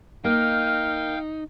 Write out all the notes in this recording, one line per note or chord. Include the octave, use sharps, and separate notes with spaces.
A#3 D#4 F5 G5 F6